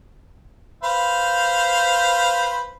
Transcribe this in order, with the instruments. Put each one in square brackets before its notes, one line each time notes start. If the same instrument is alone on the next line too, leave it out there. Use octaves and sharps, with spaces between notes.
[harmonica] B4 C5 F5